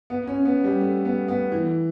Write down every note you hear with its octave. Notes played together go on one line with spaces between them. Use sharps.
B3
C#4
B3
G3
A3
B3
B3
E3